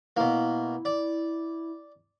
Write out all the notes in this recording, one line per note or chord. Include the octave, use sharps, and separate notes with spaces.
B2 A#3 E4
D5